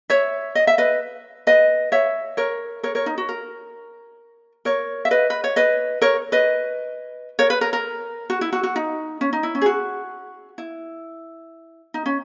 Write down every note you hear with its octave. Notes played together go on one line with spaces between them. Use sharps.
C#5 E5
D#5
E5
B4 D#5
B4 D#5
C#5 E5
A#4 C#5
A#4 C#5
A#4 C#5
D#4
F#4
A#4
A#4 C#5
E5
B4 D#5
B4
C#5
B4 D#5
A#4 C#5
B4 D#5
A#4 C#5
B4
A#4
A#4
F#4
E4
F#4
F#4
D#4
C#4
D#4
E4
C#4
G#4
F#4
E4
D#4
C#4